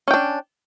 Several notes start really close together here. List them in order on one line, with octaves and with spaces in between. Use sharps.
C#4 G5 D4